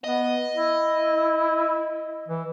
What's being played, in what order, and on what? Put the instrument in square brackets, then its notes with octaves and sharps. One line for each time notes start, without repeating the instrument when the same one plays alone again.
[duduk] B3 [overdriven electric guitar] D#5
[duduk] E4
E3